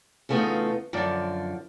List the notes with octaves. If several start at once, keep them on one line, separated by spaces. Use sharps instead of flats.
E2 C#3 A3 B3 D#4 F4
F#2 D3 F3 D5